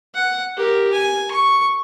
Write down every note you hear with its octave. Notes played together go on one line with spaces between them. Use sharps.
F#5
G4 A#4
G#5
C#6